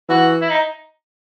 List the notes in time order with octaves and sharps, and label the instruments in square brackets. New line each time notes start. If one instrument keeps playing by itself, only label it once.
[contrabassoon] E3 [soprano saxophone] F#4
[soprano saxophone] E4
D#4